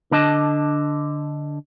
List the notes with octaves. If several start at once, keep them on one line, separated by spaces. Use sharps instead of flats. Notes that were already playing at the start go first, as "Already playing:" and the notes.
D3 D4 D#5 A5